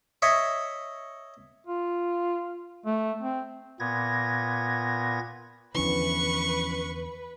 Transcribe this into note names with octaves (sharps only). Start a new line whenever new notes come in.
C#5 D#5 E5 C#6
F4
A3
C4
A#2 B3 G#6 A#6
E2 D3 E3 F3 C#4 B4 C#6